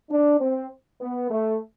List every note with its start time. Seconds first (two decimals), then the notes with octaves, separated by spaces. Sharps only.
0.10 D4
0.40 C4
1.00 B3
1.30 A3